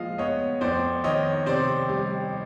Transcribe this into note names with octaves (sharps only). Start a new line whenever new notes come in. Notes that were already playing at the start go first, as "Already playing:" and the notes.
Already playing: A#2 F3 G#3 D#5 F5
B3 C#5 D#5
F2 C5 D5
D#3 C#5 D#5
C3 C5 D5
G3